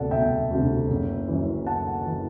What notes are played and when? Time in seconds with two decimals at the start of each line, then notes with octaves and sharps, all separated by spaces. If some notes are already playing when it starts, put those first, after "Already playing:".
Already playing: E1 D2 C3 A4 D5 F#5
0.11 E1 E5 G5
0.51 D2 C3
0.89 F#1
1.28 F#2 E3
1.66 F#1 F#5 A5
2.06 E3